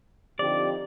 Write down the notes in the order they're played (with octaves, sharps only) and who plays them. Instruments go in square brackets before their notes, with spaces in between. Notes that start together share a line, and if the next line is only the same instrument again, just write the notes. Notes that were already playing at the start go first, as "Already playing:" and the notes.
[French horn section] D3 F3 C4 D#4 G4 [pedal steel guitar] D5